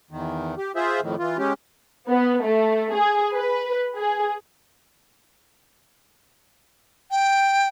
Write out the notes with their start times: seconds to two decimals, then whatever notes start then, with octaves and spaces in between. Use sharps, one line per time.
0.11 E2 D#3
0.58 G4
0.76 F4 G#4 C5 E5
1.01 F2 A2 D#3
1.19 E3 F4
1.38 G#3 C#4 G4
2.08 B3
2.43 A3
2.94 G#4
3.34 B4
3.97 G#4
7.11 G5